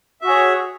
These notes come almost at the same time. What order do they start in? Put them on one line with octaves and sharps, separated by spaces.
E5 F#4 G#4 C#5